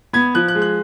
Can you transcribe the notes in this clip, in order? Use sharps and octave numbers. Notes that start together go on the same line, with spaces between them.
B3 G#6
F3 F#6
F#6
G#3
F#6